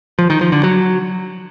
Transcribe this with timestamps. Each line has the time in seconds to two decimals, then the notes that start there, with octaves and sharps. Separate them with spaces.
0.19 F3
0.30 D#3
0.41 F3
0.52 D3
0.63 F#3